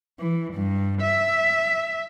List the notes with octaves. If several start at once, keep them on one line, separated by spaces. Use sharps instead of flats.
E3
G2
E5